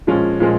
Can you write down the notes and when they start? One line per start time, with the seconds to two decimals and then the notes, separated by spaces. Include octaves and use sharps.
0.07 A#2 F3 G#3 C#4
0.40 A#2 F3 G#3